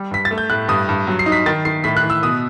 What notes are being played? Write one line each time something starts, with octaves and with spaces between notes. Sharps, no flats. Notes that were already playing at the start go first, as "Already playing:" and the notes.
Already playing: G3
G2 B6
A6
A3
G6
A2 F#6
G2 D#6
G2
F#3
C7
D#4
B6
D#3 A6
D#3 C7
A2 B6
F#6
E3
E6
B2 D#6